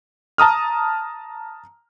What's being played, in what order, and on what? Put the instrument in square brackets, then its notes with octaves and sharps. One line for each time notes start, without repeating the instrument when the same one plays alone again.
[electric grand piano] A5 A#5 D#6 F6